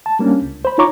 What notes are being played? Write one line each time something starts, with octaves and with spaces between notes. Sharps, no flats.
A5
G3 A#3 C#4 D4
C#2
C5 B5
D#4 F4 C#5 A#5 C#6 D6